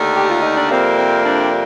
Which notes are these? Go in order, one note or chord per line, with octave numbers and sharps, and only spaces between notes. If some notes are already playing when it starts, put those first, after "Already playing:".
Already playing: D#2 D3 A3
G4
F4
D#4
D4
F2 C3 G3 A#3 C4
C4
D4